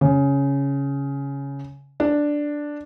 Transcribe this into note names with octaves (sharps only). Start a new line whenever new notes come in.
C#3
D4